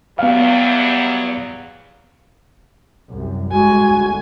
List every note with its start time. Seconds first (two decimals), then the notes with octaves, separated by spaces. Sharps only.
0.19 E2 F#3 G3 B3 F5
3.09 C2 F#2
3.52 G1 G#2 G#3 F#4 G#5
3.91 G1 D2